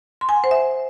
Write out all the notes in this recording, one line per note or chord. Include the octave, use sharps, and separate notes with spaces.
C6
G#5
F#5
C5
E5